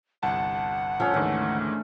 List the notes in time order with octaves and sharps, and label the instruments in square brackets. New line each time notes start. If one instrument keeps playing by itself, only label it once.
[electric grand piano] G1 C2 A5 [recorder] F#5
[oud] F3 [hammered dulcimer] A3 C#4
[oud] D2 [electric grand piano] G#2 D#3 E3